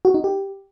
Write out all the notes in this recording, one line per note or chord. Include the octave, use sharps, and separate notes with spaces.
F#4
D#4
G4